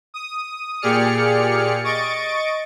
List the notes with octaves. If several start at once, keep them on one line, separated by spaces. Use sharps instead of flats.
D#6
A#2 G4 G#4 D5 F6 C#7
D#5 C#6 A6 D7